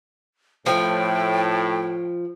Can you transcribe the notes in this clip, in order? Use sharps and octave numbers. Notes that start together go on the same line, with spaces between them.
A2 F3 G5